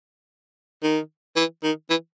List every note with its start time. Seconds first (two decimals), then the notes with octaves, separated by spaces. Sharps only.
0.83 D#3
1.36 E3
1.64 D#3
1.90 E3